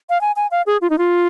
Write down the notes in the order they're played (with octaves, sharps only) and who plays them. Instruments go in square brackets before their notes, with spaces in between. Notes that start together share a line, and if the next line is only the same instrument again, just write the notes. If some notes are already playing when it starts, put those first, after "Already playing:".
[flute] F5
G#5
G#5
F5
G#4
F4
D#4
F4